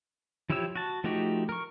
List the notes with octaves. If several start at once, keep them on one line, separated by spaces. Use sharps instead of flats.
F3 E4 G4 C#5 E6
F#4 A5
F3 A3 D#4 F#4 G4
A#4 C#6